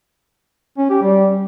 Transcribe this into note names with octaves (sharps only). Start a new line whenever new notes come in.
C#4
G4
G3